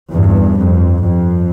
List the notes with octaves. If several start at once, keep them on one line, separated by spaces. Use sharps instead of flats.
E2 G2
F2
F2